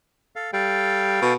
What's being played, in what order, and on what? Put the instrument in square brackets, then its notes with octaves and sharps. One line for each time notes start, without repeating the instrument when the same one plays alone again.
[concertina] A4 F5
[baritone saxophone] G3 [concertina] A4 F5 G5
[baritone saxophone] B2